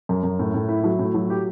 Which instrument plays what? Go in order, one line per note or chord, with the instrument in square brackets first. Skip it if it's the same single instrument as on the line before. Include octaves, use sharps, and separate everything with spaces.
[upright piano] F#2
F#2
A2
A2
E4
F#3
A2
F#3
G4